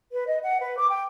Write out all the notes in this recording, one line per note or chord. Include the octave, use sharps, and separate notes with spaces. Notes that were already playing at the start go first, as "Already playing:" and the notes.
B4
D#5
F#5
B4
D6
G5